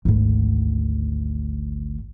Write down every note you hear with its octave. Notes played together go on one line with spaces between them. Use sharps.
G#1 D2